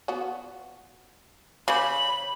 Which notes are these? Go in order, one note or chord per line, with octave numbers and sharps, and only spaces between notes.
B3 F4 F#4
C#3 G4 C5 B5 F#7